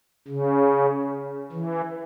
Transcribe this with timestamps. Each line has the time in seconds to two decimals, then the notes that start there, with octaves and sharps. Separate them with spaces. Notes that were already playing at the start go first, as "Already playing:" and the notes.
0.28 C#3
1.52 E3